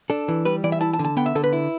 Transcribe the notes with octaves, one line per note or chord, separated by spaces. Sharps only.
D4 A4
E3
G3 B4
E3 D5
E5
E4 A5
A5
D3
A5
B3 G5
E5
D3 A4
B4
E4